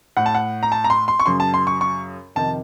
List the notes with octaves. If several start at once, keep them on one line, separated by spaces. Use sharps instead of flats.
A2 F#5
A5
F#5
A#5
A5
A#5
C6
C6
C#6
F#2 C#3 C6
A5
C6
C#6
C#6
F2 C3 D#3 A5